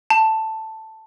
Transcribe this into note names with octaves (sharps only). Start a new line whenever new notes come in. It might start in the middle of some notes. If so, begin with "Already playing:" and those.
A5